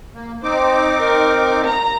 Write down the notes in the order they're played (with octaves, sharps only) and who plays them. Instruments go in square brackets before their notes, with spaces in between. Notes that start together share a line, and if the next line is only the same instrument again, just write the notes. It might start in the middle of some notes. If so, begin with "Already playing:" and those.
[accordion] A#3
[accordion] C4 D#4 D6 [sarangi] C5
[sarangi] A#4
A#5